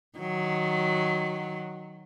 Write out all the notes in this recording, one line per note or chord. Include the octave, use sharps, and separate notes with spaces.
D#3 F#3